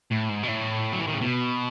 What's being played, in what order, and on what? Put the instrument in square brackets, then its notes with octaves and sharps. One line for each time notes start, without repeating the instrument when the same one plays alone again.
[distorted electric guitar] A2
G#2
B2
A2
F#3
E3
D#3
C#3
B2